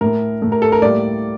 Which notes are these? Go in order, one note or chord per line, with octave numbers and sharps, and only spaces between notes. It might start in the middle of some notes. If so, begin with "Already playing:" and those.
A2 A3 A#4
A2 A3
A#4
A4
A#4
A2 G3 A#3 D5